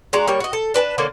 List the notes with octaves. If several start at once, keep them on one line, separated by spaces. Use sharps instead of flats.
G#3 D4 F#4 A#5
G3 A#3 C#5
F#4 D#5
A4
D4 B4 G#5 A5
D3 A#3 C#4